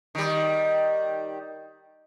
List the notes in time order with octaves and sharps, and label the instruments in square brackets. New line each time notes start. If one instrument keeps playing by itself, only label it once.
[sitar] D#3 G3